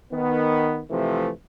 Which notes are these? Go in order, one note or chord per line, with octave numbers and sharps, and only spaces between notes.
D#3 B3
C3 E3 F3 A3